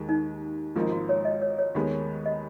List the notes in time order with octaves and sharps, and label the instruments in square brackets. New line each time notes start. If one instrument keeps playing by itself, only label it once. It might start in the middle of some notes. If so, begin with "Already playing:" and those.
Already playing: [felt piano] D#2 D#3 G#3
[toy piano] D#4
[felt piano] G#1 G#2 F3 A#3 D#4 [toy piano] F4
[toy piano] F#4
C#5
D#5
C#5
C#5
[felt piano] D#2 D#3 G#3 B3
[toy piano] D#5